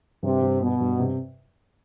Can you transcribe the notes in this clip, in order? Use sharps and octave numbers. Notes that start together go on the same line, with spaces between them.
G2 C3
G2
B2 B3
G2
C3